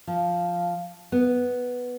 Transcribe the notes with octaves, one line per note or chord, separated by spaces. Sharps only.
F3
B3